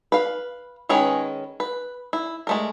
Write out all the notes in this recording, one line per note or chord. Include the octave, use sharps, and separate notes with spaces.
B4 F5
D#3 G#3 C#4 G#4 B4
B4
E4
G#3 A3 A#4